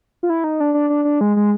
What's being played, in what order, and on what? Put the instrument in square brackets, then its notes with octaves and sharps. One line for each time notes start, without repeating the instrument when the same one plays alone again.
[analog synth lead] F4
E4
D#4
D4
D4
D4
D4
G#3
G#3